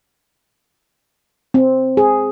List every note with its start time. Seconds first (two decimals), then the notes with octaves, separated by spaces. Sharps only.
1.54 C4
1.97 G#4